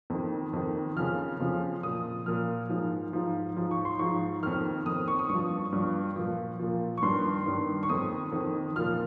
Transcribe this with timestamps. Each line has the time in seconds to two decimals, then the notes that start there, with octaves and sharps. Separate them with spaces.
0.10 F2 D#3
0.53 F2 D#3
0.96 F2 C#3 F3 F6
1.40 F2 C#3 F3
1.83 A#2 F3 D#6
2.26 A#2 F3 F6
2.69 G#2 F3
3.13 G#2 F3
3.56 G#2 F3
3.71 C#6
3.85 C6
3.99 G#2 F3 C#6
4.43 F2 D#3 F6
4.86 F2 D#3 D#6
5.08 C#6
5.19 D#6
5.29 G2 F3 C#6
5.73 G2 F3
6.16 A#2 F3
6.59 A#2 F3
6.97 C#6
7.02 G2 D#3 C6
7.46 G2 D#3
7.83 C#6
7.89 F2 D#3 D#6
8.32 F2 D#3
8.76 A#2 F3 F6